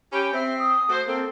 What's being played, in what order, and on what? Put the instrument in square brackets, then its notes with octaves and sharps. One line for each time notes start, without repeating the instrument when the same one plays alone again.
[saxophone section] C#4 G4 [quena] B5
[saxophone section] C4 [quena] E5
[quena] D#6
[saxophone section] A3 F#4 C5
[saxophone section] A#3 C4 [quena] A4